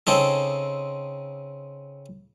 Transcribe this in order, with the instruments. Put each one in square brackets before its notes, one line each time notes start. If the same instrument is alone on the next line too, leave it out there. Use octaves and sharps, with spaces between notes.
[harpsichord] C#3 C4 D#4 A4